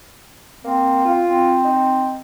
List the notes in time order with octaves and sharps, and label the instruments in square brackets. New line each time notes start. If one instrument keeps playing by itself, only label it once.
[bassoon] A#3 [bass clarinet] C4
[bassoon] F4
[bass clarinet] C4
[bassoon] D#4